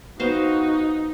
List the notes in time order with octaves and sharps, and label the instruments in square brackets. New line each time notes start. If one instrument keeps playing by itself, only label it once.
[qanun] B3 C5 F5 [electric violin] D#4 [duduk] F#4